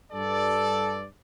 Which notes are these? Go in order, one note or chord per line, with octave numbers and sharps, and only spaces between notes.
G2 A4 D5